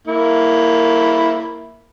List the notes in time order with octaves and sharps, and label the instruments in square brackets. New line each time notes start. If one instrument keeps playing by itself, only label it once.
[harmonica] A#3 E4